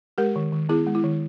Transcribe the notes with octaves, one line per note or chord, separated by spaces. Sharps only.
G#3 G4 A#4
D#3
D#3
B3 E4 G#4
G#3
E4
D#3